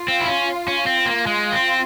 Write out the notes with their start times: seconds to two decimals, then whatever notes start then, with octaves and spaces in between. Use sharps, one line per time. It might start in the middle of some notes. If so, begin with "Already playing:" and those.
Already playing: F4
0.08 C4
0.21 E4
0.27 C#4
0.68 C#4
0.87 C4
1.06 A#3
1.26 G#3 F4
1.52 C4